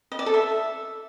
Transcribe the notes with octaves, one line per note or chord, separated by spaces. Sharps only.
D#5
D5
A4
E5